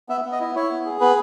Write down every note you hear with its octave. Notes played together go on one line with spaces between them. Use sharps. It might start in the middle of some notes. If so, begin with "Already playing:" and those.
B3 E5
B3
D#5
E4
E4 C#5
B3
G#4
B3 B4